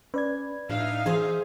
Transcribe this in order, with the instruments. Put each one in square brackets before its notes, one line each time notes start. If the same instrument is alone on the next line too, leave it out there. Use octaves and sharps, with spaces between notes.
[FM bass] C#4 [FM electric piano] B4 D5 G#6
[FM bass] A2 [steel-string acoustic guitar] D4 [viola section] D#4 E5 F5
[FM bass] E3 [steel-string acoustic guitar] G#4 C5